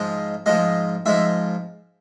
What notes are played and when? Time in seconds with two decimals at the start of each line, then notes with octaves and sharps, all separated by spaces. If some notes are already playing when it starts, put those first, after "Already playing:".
Already playing: G#2 F3 G#3 D#5
0.46 G#2 F3 G#3 D#5
1.06 G#2 F3 G#3 E5